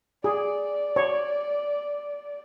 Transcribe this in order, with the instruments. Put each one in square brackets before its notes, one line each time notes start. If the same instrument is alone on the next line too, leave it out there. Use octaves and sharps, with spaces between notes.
[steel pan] G#4 [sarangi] D5
[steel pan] C#5